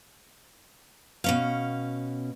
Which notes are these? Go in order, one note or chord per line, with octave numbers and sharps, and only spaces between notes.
B2 C#4 F5